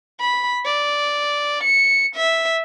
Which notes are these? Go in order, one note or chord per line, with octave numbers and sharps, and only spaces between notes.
B5
D5
C#7
E5